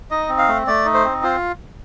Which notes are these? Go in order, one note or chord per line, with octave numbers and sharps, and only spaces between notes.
D#4 D#5
C4
F5
A3
A3 D5
D#4
C5
C4
F4 C5